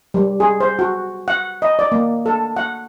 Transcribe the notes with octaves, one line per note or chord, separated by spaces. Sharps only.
G3
G#4
C5
F#4
F#5
D#5
D5
A#3
A4
F#5